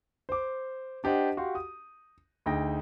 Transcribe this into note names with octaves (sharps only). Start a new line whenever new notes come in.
C5 D6
D4 G4 C5 D#5 F#5
F#4 G4 F5 C6
D#6
D2 D#4 G#4 G5 A#6